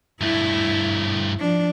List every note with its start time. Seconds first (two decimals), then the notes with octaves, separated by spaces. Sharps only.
0.21 G2 A3 E4
1.39 F3 D4